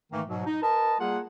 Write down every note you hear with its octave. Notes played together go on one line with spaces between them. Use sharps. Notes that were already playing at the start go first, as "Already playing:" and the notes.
G#2 D#3 E3 A3 A#3
G#2 B2 F#3
D#4
A#4 B4 D#5 A5
G3 A#3 F4 G#4 F#5